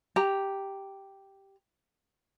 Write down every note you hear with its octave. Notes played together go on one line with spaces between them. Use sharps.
G4 A#5